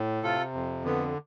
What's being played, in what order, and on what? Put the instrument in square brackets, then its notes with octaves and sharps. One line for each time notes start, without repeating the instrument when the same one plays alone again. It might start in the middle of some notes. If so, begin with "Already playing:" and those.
Already playing: [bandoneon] A2
[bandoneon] C3 [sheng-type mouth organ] F4 A4
[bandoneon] F2
[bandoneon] D3 [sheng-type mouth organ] B3